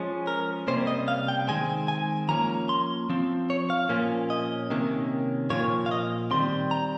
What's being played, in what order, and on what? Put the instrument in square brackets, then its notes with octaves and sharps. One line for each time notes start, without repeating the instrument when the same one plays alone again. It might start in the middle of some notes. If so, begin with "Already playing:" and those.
Already playing: [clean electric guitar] F3 G#3 C#4
A#4
C3 G3 A#3 C#4 C5
D#5
F5
G5
D#3 G#3 C4 G#5
G#5
F3 A#3 C#4 A#5
C6
F3 C4
C#5
F5
A#2 F3 A#3 C#4
D#5
C3 D#3 A#3 C#4
A#2 F3 A#3 C#5
F5
D#5
D#3 G3 C4 C6
A#5